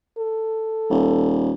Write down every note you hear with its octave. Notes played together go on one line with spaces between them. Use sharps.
A4
D#1